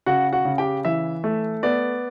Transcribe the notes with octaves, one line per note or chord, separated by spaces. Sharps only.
C#3 F#4 F#5
F#4 F#5
C#3
G4 G5
E3 E5
A3
B3 D5